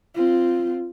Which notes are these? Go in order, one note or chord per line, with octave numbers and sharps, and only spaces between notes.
C4 F4